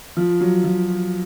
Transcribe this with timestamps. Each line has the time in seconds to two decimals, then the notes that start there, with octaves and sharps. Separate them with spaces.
0.17 F3
0.40 F#3
0.64 F3